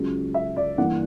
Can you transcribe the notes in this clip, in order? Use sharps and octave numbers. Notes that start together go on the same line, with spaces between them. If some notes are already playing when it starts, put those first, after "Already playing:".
Already playing: C#2 C#3 F#3
E5
D5
G2 E3 A#3 F#5